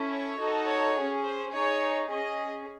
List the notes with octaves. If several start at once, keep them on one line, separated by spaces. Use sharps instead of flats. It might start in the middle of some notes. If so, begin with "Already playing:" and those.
Already playing: C#4 E4 A4
C#5
D#4 F#4 A4
C#5
G#4
C#4
C5
D#4 G#4 C#5
C#4 G#4 D#5